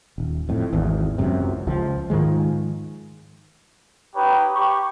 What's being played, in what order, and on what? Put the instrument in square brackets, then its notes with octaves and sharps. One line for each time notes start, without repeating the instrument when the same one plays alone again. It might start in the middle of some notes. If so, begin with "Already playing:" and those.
[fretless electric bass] D#1
F2 A2
G#1 E2
F#1 C#2 F#2 C3
C#2 F3
G#2 D#3 F3 G#3
[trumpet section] D#4 G4 B4 C#5
G4 C#6